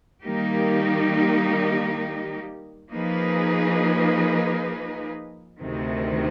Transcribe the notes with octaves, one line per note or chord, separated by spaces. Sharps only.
D#3 G3 A#3 D#4 G4
F3 A#3 D#4 G#4 B4
D2 C3 D#3